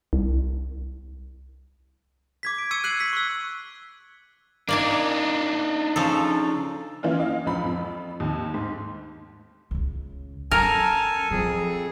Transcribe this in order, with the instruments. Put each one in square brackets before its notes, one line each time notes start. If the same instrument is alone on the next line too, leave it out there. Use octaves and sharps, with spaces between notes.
[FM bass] C2
[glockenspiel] D6 G#6 B6
D7
C#6 E6 G#6 C#7 D#7
F#6 C7 D#7 F#7
B6
C#6 E6
[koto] A#3 D5 G#5 [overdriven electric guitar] D4 D#4
[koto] C#3 F3 A4
[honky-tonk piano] E3 A#3 C#4 E4 F4
D#5 F5
C#2 F3 B5
F2
D#2
G#2
[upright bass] C#2 C#3
[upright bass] F#3 C#4 [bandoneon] A4 G#5 A5 [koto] A#4
[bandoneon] F2 G#4 [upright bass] F3 F#3